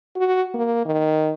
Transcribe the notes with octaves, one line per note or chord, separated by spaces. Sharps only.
F#4
A#3
D#3